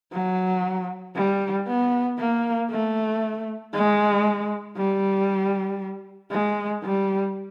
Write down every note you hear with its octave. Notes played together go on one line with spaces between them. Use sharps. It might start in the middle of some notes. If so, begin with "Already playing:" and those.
F#3
G3
B3
A#3
A3
G#3
G3
G#3
G3